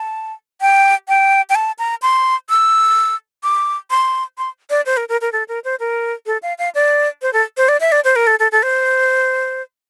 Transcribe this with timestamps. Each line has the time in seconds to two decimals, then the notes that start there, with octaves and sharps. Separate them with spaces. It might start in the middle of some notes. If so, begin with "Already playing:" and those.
Already playing: A5
0.61 G5
1.08 G5
1.50 G5
1.55 A5
1.79 A#5
2.02 C6
2.49 E6
3.43 D6
3.90 C6
4.38 C6
4.70 D5
4.86 C5
4.97 A#4
5.09 A#4
5.21 A#4
5.32 A4
5.48 A#4
5.64 C5
5.80 A#4
6.26 A4
6.43 F5
6.58 F5
6.75 D5
7.22 C5
7.33 A4
7.57 C5
7.68 D5
7.80 E5
7.92 D5
8.04 C5
8.16 A#4
8.27 A4
8.39 A4
8.52 A4
8.63 C5